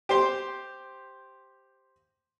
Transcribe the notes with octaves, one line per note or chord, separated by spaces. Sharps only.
G4 C5 C6